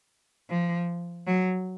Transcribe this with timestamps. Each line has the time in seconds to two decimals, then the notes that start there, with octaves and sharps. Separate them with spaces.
0.50 F3
1.26 F#3